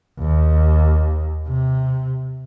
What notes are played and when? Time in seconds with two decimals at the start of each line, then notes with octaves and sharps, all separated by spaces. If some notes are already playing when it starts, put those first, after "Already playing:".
0.19 D#2
1.48 C3